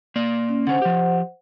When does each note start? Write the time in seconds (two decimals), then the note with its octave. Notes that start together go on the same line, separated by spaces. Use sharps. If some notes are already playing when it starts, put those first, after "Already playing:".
0.16 A#3 D5
0.49 C#4
0.67 D3 C#4 C5 F#5
0.82 F3 G4